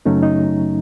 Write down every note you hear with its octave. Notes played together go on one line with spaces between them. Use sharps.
F#2 C#3 F#3 A3 C#4 D#4
D#4